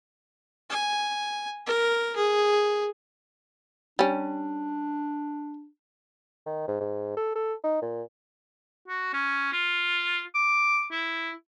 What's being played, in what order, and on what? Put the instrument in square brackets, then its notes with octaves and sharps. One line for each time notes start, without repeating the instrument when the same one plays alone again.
[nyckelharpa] G#5
A#4
G#4
[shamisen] G3 C#4 [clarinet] D4
[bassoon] D#3
G#2
G#2
A4
A4
D#4
A#2
[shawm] F#4
C#4
F4
D6
E4